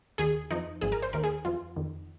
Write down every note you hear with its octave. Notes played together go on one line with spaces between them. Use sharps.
D#2 D#3 G#4
F2 F3 D#4
G#1 G#2 F3 G#4
A#4
C5
D#2 D#3 A#4
G#4
F2 F3 F4
F2 D#3